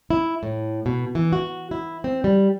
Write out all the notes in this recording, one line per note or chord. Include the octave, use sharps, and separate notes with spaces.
E4
A2
B2
E3
F#4
E4
C4
G3